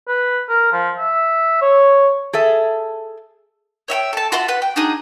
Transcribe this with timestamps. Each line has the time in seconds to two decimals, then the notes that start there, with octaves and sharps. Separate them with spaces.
0.08 B4
0.49 A#4
0.72 F3
0.98 E5
1.62 C#5
2.33 G#4 A4 E5
3.88 C#5 E5 F#5 G5
4.13 A4 A5
4.32 F4 F#4 E5 C6
4.48 B4 F#5
4.62 G5
4.76 D4 D#4 F#4 G#4